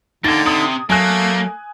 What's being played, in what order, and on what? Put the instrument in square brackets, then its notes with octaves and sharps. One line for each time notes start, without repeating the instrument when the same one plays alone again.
[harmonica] D3 [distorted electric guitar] A#3 G4 [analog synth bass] D#4 [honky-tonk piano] G#6 A6
[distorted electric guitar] C3 [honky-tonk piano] D#6
[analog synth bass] F#3 [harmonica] A3 [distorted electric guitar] A#3 [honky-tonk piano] G#5 F#6